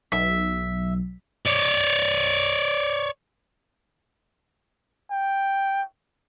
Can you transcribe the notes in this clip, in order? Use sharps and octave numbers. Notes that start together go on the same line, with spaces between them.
B1 E5
C#5 D5
G5